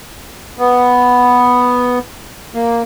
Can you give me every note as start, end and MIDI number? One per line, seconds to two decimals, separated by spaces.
0.59 1.99 59
2.55 2.83 58